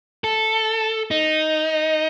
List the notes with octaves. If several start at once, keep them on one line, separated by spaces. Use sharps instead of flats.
A4
D#4